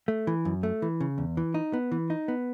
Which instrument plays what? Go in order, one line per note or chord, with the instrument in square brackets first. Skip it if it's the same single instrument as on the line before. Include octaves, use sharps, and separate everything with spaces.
[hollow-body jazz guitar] A3
E3
F#2
A3
E3
C#3
E2
E3
D#4
B3
E3
D#4
B3